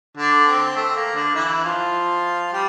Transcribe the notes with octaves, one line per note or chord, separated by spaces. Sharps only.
D3 D4
C4
A3
A#3
D3 D4
E3 E4
F3 F4
G3 G4